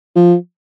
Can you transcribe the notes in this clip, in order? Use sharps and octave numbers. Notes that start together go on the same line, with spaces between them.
F3